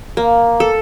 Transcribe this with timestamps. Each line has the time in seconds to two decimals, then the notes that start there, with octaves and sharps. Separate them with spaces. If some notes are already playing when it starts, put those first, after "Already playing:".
0.17 A#3
0.60 A4